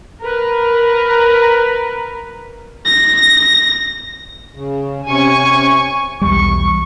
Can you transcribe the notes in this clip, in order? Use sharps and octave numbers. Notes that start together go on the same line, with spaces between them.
A#4 B4
A#6
C#3
C3 C#4 G#5 C#6
B1 E2 G3 C#6